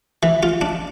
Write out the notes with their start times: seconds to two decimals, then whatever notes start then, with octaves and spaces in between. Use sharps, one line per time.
0.23 E3
0.43 F4
0.61 D4